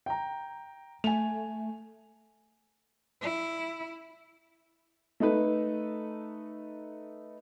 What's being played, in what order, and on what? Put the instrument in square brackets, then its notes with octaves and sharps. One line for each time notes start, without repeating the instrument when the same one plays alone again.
[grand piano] G5 A#5
[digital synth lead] A3 [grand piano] G#5 F7
[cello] E4
[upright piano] A3 D#4 A4 B4